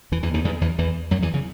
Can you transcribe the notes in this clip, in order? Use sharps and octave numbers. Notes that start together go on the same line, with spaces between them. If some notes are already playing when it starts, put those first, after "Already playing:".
E2 E3
E2 E3
D#2 D#3
E2 E3
E2 E3
E2 E3
F#2 F#3
E2 E3
C#3